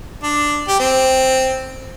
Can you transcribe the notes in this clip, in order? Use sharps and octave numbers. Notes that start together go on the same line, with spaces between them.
D4
G4
C4